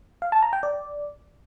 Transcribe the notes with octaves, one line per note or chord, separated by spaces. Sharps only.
F5
A5
A#5
G5
D5